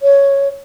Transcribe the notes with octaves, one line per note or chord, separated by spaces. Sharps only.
C#5